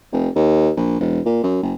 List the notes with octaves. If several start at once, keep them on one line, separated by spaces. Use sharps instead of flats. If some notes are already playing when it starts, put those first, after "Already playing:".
F1
D#2
A#1
E1
A#2
F#2
F#1